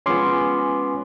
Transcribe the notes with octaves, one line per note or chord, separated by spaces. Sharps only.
F3 G#3 B3 C#4 F4 G#5 C6 D6